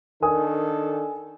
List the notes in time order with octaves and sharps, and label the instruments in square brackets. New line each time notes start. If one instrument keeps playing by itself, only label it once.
[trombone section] D#3 D4 A4 [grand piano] A#4 G#5 D#6